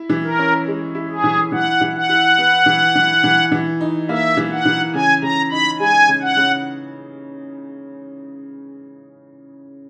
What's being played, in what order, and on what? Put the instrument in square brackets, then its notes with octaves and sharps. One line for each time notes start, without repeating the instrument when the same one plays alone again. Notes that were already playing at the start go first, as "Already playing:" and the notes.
Already playing: [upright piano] E4
E3
[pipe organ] A#4
[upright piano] C#4
G#3
E4
[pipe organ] G#4
[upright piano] E3
[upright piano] E3 [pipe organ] F#5
[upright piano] E3
[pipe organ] F#5
[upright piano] E4
B3
E3
E3
E3
E3
D#4
[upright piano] A#3 [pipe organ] E5
[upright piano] E3
[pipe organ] F#5
[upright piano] E3
[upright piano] C#3 [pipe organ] G#5
[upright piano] C#3 [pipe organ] A#5
[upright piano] D#4 [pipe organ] B5
[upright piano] G#3 [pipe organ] G#5
[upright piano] C#3
[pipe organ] F#5
[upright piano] C#3